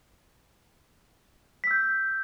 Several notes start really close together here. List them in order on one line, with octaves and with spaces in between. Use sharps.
B6 E6 G6